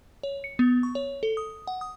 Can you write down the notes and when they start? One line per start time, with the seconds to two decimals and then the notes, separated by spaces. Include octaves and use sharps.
0.23 C#5
0.44 C#7
0.59 B3
0.83 C#6
0.95 C#5
1.23 A4
1.37 D#6
1.67 F#5
1.81 D#6